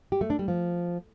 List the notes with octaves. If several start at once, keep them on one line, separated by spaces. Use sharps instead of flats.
G4
A3
D4
G3
F3